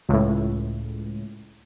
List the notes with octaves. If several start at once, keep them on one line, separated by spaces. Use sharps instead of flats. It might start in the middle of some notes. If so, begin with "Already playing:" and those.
C#2 A2